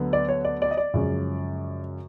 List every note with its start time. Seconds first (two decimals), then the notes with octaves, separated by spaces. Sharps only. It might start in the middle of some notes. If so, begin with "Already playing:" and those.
Already playing: D2 D3 F#3 B3
0.13 D5
0.29 C#5
0.45 D5
0.62 D5
0.71 D#5
0.77 D5
0.94 F#2 C#3 F3 G#3 C#4